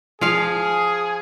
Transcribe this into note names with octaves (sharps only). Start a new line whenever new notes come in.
F3 G#4 F5